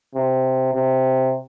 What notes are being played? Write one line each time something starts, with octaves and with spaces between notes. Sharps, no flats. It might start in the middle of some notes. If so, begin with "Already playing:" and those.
C3
C3